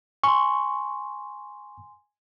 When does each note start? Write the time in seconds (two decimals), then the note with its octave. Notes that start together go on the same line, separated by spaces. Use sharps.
0.24 G#5 C6 C#6